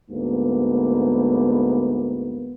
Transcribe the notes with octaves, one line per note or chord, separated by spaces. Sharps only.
D2 G#2 A#3 B3